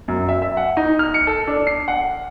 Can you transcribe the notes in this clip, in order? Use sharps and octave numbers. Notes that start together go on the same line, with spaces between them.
F#2
E5
E5
F#5
D#4
F6
C#7
A4
D4
C7
F#5